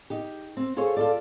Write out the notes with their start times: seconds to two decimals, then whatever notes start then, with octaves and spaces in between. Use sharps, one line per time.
0.10 D#4 G4
0.57 C4
0.77 F4 G#4 A4 C5 C#5
0.97 F4 A4 D5